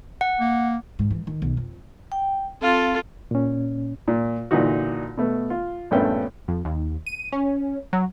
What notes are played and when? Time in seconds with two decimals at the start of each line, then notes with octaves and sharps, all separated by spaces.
0.21 F#5
0.40 A#3
0.99 G#2
1.10 E3
1.27 D#3
1.42 B1
1.57 F2
2.12 G5
2.61 C4 F4 A4 F5
3.31 A#2 C#4
4.08 A#2
4.51 A#2 D3 E3 D#4 F#4
5.17 B2 A3 B3
5.50 F4
5.91 A#1 G2 A3 B3 C#4 G5
6.48 F2
6.65 D#2
7.06 D#7
7.32 C#4
7.93 F#3